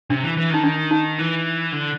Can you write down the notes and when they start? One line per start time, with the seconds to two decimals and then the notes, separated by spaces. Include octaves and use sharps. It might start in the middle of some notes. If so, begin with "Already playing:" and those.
0.10 C3 D4
0.23 E3
0.37 E3
0.50 D#3 D#4
0.64 D4
0.91 D#4
1.19 E3
1.72 D3